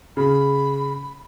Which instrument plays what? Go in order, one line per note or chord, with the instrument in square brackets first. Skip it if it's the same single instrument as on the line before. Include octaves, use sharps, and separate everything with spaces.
[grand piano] C#3 [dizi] B5